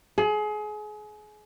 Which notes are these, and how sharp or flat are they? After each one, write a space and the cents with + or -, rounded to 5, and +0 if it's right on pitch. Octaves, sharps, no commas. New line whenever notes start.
G#4 +30